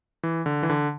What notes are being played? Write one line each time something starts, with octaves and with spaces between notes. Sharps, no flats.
E3
D3
E3
D3